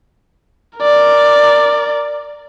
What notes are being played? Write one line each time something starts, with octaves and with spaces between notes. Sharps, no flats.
A#4 D5